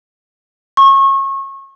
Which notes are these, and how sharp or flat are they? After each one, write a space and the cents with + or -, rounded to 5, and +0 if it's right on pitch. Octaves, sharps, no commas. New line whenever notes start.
C#6 -30